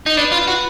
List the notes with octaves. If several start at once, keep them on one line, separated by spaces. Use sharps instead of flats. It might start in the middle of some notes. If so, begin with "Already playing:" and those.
D#4
D4 B4
F4
F#4